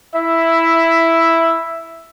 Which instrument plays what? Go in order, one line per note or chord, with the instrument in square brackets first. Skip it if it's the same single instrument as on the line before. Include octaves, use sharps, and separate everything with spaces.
[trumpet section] E4 E5